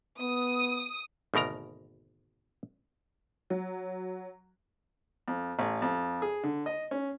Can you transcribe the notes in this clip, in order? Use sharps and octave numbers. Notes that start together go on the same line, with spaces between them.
B3 D#6
G#1 D2 B2 A#4 A#5
F#3
F2
A1
F2
G#4
D3
D#5
C#4